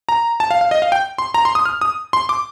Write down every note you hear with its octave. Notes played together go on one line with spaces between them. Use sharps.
A#5
A5
F5
F5
D#5
F5
G5
C6
A#5
C6
D#6
F6
D#6
C6
D6